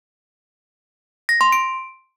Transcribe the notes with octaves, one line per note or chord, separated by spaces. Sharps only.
A#6
C6
D7